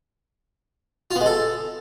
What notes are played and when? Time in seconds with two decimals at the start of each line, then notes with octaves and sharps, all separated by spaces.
1.11 F4
1.16 B3
1.21 G#3
1.26 A4